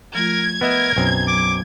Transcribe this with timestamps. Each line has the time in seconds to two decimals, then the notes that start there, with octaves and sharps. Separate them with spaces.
0.15 F3 A3 F4 A#4 G#6
0.61 B3 A#4 D#5 E5
0.96 B1 F#2 C4
1.27 F#3 D6